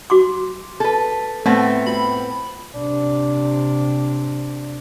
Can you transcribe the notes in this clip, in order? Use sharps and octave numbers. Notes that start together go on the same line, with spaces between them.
F#4 C6 D6
A4 B4
A2 A3 B3 C4
F4 B5
C3 D4